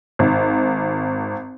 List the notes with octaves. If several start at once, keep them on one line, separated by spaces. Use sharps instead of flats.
G#1